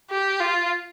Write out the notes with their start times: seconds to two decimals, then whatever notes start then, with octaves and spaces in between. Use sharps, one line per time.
0.10 G4
0.40 F4